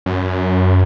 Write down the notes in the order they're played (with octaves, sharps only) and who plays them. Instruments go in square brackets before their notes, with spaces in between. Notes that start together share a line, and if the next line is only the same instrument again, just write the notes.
[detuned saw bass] F#2